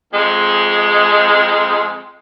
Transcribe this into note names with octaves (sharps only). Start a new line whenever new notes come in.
F2 G#3